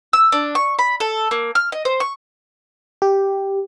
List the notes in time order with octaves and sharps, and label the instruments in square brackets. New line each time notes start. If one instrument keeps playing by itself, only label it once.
[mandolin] E6
D4
C#6
B5
A4
A#3
F6
D#5
C5
C#6
[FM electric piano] G4